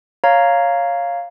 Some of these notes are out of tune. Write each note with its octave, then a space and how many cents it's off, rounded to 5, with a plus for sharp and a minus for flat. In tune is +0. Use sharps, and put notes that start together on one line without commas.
C#5 +0 F5 +0 A#5 +0